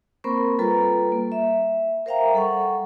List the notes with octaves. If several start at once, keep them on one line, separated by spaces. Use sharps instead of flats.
A#3 C4 A#4 C5 B5 C#6
G3 F4 A4 B4 A#5
A#3
E5
A#4 C5 E5 F5 G5 A#5
G3 A4 F#5 C#6